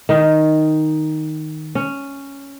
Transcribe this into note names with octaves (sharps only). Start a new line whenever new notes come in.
D#3 D#4
C#4